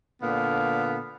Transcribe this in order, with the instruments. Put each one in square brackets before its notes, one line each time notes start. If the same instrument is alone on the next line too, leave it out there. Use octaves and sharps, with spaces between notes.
[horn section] A#2 D3 B3 F5